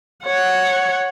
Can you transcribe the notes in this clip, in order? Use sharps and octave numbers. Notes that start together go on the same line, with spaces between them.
C#5 F#5